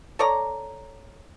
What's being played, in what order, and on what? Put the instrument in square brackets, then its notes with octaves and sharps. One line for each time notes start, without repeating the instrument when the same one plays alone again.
[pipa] A4 C#5 D5 A#5